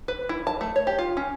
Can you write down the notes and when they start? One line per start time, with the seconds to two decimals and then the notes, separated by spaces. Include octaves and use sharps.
0.08 B4
0.29 E4
0.47 A5
0.61 A3
0.76 C#5
0.87 G4
0.99 F4
1.17 C#4